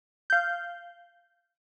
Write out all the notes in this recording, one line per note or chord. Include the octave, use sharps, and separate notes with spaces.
F5 G6